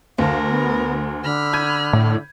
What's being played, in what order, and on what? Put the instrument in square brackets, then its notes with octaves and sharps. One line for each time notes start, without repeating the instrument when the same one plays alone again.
[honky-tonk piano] D2 A5 [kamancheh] A#4 [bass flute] F5
[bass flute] B3
[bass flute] D3 [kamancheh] B5 F6
[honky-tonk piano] G6 G#6 D#7
[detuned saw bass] A2